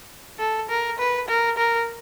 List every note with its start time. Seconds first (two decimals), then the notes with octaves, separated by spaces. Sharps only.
0.39 A4
0.69 A#4
0.99 B4
1.28 A#4
1.57 A#4